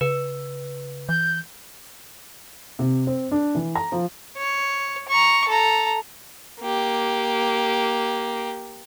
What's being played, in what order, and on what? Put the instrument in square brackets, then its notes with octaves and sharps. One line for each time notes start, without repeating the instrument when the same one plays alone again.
[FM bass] C#3 [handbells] B4
[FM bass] E3 [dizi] G6
[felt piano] C3
C4
D4
E3
A#5
F3
[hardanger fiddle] C#5
A#5 C#6
A4 A#5
[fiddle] A#3 G4